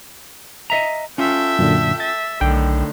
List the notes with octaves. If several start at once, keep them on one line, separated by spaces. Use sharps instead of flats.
D#5 E5 A#5
C#4 F4 A4 E5 G5
F#2 A#2 D3
E5 A6
B1 A2 D3 D#3 G5